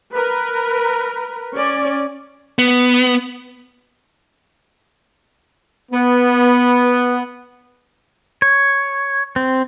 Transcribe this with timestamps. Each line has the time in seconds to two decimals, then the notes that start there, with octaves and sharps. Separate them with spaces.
0.12 A#4 B4
1.54 C#4 D5
2.59 B3
5.91 B3
8.42 C#5
9.36 C4